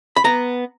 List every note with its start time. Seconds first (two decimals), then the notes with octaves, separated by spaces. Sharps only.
0.16 B5
0.24 B3 A#5